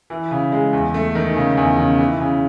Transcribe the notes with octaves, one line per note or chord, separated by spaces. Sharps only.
E3
C#3
G#3
E2
A3
D#3
C#3
E2
C#3
E3
C#3